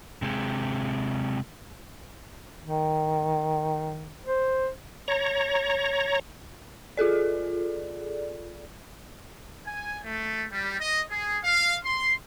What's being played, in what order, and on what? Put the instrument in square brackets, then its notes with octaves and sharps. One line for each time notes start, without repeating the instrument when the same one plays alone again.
[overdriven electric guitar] C3 G#3
[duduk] D#3
C5
[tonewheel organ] C#5 A#5
[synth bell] F4 G#4 A4 D5
[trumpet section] G#5
A3
G3
D#5
G#4
F5
C6